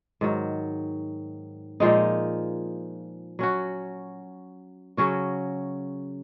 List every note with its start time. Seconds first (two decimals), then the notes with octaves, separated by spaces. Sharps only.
0.21 G#2 D#3 F#3
1.80 A#2 F3 G#3 D#4
3.39 F#3 C#4 F#4
4.97 C#3 F#3 C#4 F#4